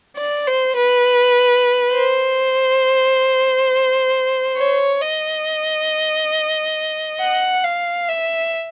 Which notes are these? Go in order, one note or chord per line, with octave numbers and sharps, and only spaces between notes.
D5
C5
B4
C5
C#5
D#5
F#5
F5
E5